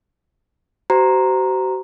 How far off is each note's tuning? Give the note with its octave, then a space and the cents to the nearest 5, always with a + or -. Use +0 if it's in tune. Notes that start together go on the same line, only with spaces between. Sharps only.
F#4 +45 C5 -25 A#5 +0